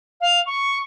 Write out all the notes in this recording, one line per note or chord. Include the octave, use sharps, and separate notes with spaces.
F5
C#6